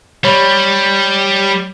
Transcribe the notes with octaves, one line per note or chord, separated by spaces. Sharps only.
G3 C#5 B5